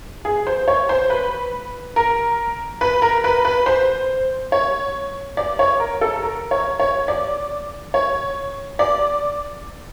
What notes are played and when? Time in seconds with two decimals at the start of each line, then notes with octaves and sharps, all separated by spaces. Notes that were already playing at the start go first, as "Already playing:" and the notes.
0.25 G#4
0.47 C5
0.68 C#5
0.89 C5
1.10 B4
1.96 A#4
2.81 B4
3.02 A#4
3.24 B4
3.45 B4
3.66 C5
4.52 C#5
5.37 D5
5.59 C#5
5.80 A#4
6.01 A4
6.23 A#4
6.51 C#5
6.80 C#5
7.08 D5
7.94 C#5
8.79 D5